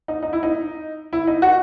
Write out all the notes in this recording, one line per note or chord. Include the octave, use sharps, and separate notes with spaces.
D#4
D#4
E4
D#4
E4
D#4
F#4